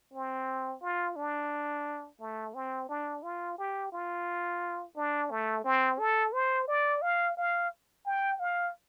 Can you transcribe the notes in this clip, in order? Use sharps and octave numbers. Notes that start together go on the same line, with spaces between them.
C4
F4
D4
A3
C4
D4
F4
G4
F4
D4
A3
C4
A4
C5
D5
F5
F5
G5
F5